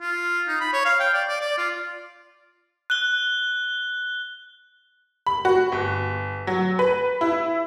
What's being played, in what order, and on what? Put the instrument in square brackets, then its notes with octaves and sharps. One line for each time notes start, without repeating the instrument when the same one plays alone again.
[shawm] F4
D#4
B5
C#5
F5
G5
D5
D5
D5
F4
[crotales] F#6 G7
[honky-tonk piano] B5
F#4
G1
F#3
B4
E4